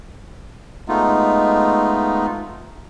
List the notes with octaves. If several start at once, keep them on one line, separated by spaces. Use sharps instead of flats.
G#3 A3 B3 D#4 F4